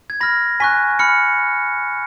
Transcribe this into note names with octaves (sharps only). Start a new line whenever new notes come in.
G#6
B5 F6 A#6
G#5 C#6 F#6 B6
B5 F6 C#7